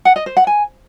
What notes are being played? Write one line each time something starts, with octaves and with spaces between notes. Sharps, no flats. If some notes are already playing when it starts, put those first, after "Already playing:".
F#5
D#5
C5
F#5
G#5